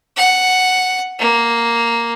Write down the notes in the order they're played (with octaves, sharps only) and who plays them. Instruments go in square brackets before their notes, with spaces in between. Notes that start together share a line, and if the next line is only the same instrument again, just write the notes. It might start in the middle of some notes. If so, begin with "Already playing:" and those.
[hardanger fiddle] F#5
A#3